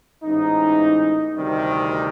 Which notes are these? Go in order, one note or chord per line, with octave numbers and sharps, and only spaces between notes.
A1 G#2 E3 D#4
D2 C3 D#3 G3